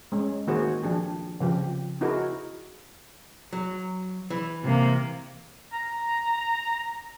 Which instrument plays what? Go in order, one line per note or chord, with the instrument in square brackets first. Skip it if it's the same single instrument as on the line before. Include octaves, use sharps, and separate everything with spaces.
[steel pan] G#3 C#4
D#3 A#3 F#4 G#4 C5
F3 D4 G4 G#4
C#3 F3 G4
D#4 E4 F#4 G#4 A#4
[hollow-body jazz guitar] F#3
E3
[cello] C3 A#3
[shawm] A#5